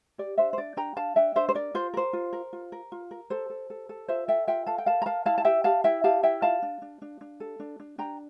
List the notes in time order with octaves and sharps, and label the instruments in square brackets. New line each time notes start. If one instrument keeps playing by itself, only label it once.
[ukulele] G4 D5
D4 C5 E5
C5
D4 D5
D4 G5 A#5
D4 F5 A5
D4 E5 G5
D4 C5 E5
C5
A#4 D5
F4 C5
A#4 C5
F4
A#4
F4
A#4
F4
A#4
A4 C5
A4
A4
A4
F4 C5 E5
A4 E5 G5
F4 E5 G5
A4 F5 A5
G5
A#4 F5 A5
A#5
A#4 F5 A5
E4 F5 A5
A5
G4 E5 G5
G4 F5 A5
E4 E5 G5
G4 F5 A5
E4 E5 G5
F4 F5 A5
D4
D4
D4
D4
A4
D4
D4
D4 G5 A#5